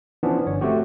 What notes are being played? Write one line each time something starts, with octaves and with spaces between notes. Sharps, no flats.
E3 F3 B3 C#4 D4
G1 C#5
A3 C4 F#4 G4